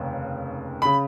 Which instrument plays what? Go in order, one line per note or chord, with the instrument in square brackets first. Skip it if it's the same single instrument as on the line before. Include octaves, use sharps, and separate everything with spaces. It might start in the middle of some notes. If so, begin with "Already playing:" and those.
Already playing: [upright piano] F1 D#2 C#3
C#3 B5